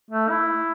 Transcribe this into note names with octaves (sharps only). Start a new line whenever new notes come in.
A3
E4